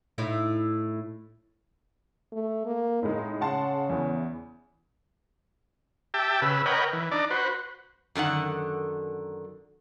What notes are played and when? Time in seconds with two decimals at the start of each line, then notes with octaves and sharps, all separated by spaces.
0.18 A2 D#4 E4
2.32 A3
2.65 A#3
3.03 A2 G#3 D#4
3.41 C#3 F#5 A5 C6
3.89 E2 E3 B3
6.14 G4 E5 G5 A5
6.42 C#3 B4 E6
6.66 A#4 B4 C#5 D#5 F#5 G5
6.93 E3
7.12 D4 D#4 D5
7.30 F#4 B4 C5
8.15 F#2 D3 D#3 F#5